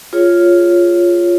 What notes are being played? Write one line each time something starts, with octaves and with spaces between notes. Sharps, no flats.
F4 G#4 C#5